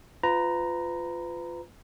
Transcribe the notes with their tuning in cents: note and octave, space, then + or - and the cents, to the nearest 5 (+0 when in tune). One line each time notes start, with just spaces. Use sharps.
F4 +0 B4 +30 A#5 +0